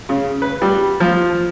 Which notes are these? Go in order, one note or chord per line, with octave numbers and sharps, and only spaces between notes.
C#3
B4
G3
F3